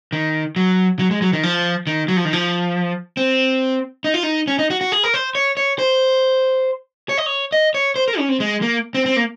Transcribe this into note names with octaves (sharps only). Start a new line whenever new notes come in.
D#3
F#3
F#3
G#3
F#3
D#3
F3
D#3
F#3
F3
D#3
F3
C4
D#4
F4
D#4
C#4
D#4
F#4
F#4
G#4
A#4
C5
C#5
C#5
C5
C#5
D#5
C#5
D#5
C#5
C5
A#4
C#4
C4
G#3
A#3
C4
C4
A#3